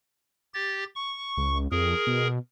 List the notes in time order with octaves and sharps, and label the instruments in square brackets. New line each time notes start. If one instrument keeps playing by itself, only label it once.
[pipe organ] G4 A6
C#6
[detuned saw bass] C#2
[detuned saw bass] F2 [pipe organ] G#4 A#4
[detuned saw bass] B2